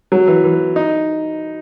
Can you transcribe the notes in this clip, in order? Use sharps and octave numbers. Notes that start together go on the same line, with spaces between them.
F#3
E3
E3
D#4